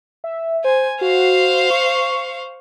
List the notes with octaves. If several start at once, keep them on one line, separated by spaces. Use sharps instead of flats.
E5
C5 G#5
F#4 C5 F5
C#6